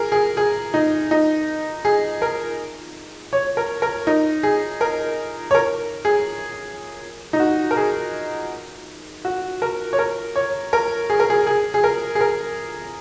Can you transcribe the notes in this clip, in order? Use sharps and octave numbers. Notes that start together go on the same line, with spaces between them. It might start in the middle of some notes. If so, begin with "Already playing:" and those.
Already playing: G#4 A#4
G#4
G#4
D#4
D#4
G#4
A#4
C#5
A#4
A#4
D#4
G#4
A#4
C#5
A#4
G#4
D#4
F#4
A#4
G#4
F#4
A#4
C#5
A#4
C#5
A#4
G#4
A#4
G#4
G#4
G#4
A#4
G#4
A#4